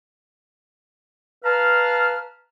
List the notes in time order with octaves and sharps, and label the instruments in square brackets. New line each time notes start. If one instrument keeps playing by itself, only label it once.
[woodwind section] B4 F5 A5 A#5 F6